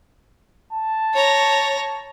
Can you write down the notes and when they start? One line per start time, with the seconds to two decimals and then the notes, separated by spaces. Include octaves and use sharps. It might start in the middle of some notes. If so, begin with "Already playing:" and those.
0.73 A5
1.13 C#5 A#5